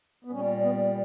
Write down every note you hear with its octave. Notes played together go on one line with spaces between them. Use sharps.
B3
A#2 G3 C#4
B3